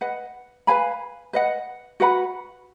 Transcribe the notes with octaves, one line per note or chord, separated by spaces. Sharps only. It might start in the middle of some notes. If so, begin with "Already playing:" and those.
B4 D#5 F#5
B4 F5 G#5 B5
B4 D#5 F#5
F#4 B4 F#5 B5